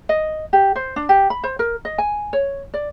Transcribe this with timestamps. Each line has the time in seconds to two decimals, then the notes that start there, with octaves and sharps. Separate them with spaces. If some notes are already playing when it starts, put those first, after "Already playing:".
0.09 D#5
0.53 G4
0.76 C5
0.96 D4
1.09 G4
1.30 B5
1.44 C5
1.59 A#4
1.85 D#5
1.98 G#5
2.33 C#5
2.74 D5